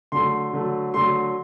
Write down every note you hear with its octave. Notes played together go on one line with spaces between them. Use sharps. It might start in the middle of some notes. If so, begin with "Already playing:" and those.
D3 F#3 A3 C6
D3 F#3 A3
D3 F#3 A3 C6